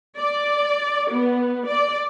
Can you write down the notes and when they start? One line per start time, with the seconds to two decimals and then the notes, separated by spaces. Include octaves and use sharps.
0.19 D5
1.11 B3
1.66 D5